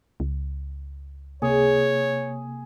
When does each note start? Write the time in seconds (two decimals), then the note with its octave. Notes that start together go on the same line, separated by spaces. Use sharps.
0.20 C#2
1.42 C3 A#3 G#4 C#5